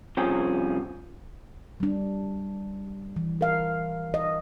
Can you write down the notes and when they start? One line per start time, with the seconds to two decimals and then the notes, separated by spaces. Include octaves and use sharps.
0.17 C2 C3 F3 C#4 G#4 G5
1.80 G3 D4
3.16 E3
3.41 A#4 F5
4.14 D#5